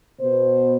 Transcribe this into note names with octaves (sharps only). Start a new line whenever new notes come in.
B2 B3 C5